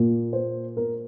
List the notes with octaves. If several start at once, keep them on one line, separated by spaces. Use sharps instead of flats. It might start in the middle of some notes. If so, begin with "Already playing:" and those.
Already playing: A#2 A#3
C5
A#4